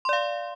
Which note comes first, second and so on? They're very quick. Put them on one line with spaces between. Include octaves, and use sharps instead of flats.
C6 D5 F5